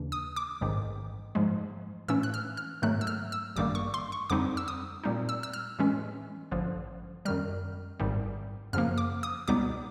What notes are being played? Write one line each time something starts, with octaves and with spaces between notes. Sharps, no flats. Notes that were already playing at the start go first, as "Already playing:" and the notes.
Already playing: D#2 C#3 E3 D4
D#6
D6
A1 G#2 D#3
G#2 F3 G#3
A2 E3 A3 C#4 E6
F#6
F6
F6
G#2 D#3 F#3 A3 F#6
E6
F6
E6
G#1 G2 D#3 G3 A#3 D6
C#6
C6
C#6
F2 D3 G3 C4 D#4 D6
E6
D#6
A#2 G3 C4 D#4
E6
E6
F6
A2 E3 G#3 C#4
A1 G2 D3 F3
F#2 D#3 G3 F6
G#1 G#2 D#3 G3
F#2 C#3 F3 A#3 F6
D6
D#6
C#2 B2 G3 B3 D#4 D6